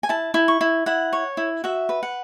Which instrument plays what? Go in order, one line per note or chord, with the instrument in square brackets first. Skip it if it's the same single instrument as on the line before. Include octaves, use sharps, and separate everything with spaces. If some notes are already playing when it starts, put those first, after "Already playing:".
[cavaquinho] G#5
E4 A5
E4
C#6
E4
E4 F#5
C#5
E4
F#4 E5
B4
F#5